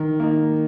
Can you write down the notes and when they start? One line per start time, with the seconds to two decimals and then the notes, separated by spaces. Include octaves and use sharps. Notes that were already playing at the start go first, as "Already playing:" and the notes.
Already playing: D#3
0.20 A#3 D#4